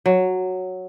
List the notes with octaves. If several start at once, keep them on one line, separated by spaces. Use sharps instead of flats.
F#3